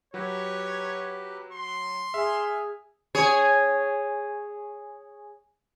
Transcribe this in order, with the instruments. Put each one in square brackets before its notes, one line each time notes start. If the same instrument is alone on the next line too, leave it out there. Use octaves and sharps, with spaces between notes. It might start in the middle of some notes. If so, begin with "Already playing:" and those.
[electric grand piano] F#3 F#4 [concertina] G4 B4 [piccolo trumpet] C#5
[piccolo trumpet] C6
[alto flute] G#4 [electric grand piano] E5 [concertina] F6
[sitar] G#4 C#5